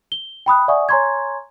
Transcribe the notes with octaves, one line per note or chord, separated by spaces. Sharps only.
G7
G5 B5 D#6 F#6
D5 E5 F#5 G#5 C#6 D#6
C#5 G#5 A#5 C6 C#6 G#6